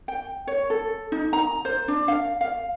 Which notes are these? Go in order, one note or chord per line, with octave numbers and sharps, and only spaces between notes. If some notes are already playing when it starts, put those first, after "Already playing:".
G5
C#5
A4
D#4
A#5
C5
D4
F5
F5